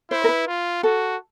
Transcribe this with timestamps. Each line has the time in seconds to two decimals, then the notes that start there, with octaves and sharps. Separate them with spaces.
0.11 E4 C5
0.24 A#4
0.29 B4
0.47 F4
0.83 F#4 A4